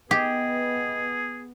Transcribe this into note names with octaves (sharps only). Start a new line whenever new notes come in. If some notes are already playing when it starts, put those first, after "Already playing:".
B3 G4 G#4 D#5